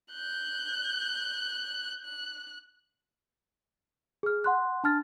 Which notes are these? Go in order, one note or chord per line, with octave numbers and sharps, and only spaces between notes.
F#6 G6
F#6
G#4 F6
F#5 C6 F#6
D4 A5 F6 A6